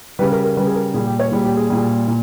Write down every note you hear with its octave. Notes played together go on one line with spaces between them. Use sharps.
C#3 G3 B4
A#4
A#4
C#3 G3 B4
G#4
A#4
A#2 G3 G#4
G4
C#5
A#2 G3 G#4
G4
G#4
A#2 G3
A#2